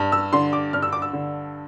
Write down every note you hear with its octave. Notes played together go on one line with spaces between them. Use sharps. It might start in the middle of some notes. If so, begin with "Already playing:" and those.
Already playing: G2
E6
D3 C6
D6
G2 F6
E6
D6
E6
D3